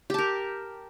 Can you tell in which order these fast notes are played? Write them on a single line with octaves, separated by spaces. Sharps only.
G4 A5 A#4